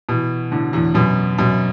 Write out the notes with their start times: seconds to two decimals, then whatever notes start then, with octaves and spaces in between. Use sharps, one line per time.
0.09 B2 E3
0.51 A2 D3
0.73 E2 A2
0.94 F#2 B2
1.38 F#2 B2